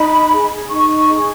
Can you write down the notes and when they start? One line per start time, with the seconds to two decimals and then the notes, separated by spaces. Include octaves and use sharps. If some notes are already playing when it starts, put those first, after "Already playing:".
Already playing: D#4 B5
0.31 G#4
0.70 D#4 C#6
1.10 G#4